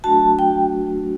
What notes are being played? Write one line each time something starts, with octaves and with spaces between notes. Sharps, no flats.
F#3 A3 D4 F#4 A5
G5